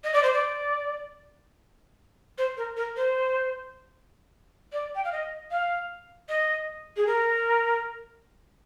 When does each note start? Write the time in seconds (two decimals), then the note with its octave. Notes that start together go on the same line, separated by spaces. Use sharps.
0.04 D#5
0.13 D5
0.23 C5
0.33 D5
2.38 C5
2.57 A#4
2.77 A#4
2.96 C5
4.73 D5
4.95 G5
5.04 F5
5.12 D#5
5.51 F5
6.29 D#5
6.97 G#4
7.07 A#4